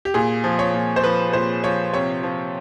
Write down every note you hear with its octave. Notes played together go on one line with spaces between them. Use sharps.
G4
A#2 G#4
F3
C#5
A#2
C5
F3 B4
A#2 C5
F3 C#5
C3 C#5
F3